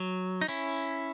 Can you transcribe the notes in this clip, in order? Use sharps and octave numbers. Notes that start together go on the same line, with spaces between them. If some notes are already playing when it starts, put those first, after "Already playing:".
Already playing: F#3
D#4
C#4 E4